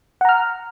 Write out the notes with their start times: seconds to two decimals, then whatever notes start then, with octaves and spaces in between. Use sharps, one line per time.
0.21 F#5
0.25 A#5
0.29 F6